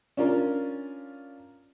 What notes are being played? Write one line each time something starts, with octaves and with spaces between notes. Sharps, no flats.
C#4 D4 F4 A#4